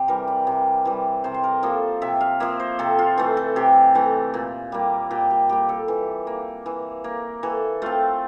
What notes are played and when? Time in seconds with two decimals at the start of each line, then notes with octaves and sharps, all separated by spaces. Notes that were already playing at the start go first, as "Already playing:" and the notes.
Already playing: C3 G4
0.08 E3 G3 A#4
0.28 D5
0.47 C3
0.85 E3 G3
1.24 C3 C5
1.34 C5
1.43 A#4
1.63 F3 A#3 A4
2.02 C3 E5
2.21 F5
2.40 F3 A#3 E5
2.60 C5
2.79 C3 A4
2.99 F4
3.18 E3 A3
3.37 A4
3.56 C3 G4
3.95 E3 A3
4.34 A#2
4.72 G3 A#3
5.11 A#2 G4
5.30 G4
5.49 G3 A#3 G4
5.69 A4
5.88 E3
6.27 A#3
6.66 E3
7.04 A#3
7.43 E3 A4
7.82 A3 C4 F4